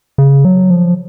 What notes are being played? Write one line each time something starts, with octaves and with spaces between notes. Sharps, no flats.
C#3
F#3
F3